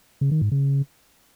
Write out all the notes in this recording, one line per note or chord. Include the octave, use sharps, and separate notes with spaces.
C#3
D#3
G#2
C#3